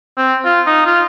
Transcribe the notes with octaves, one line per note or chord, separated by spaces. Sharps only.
C4
F4
D#4
F4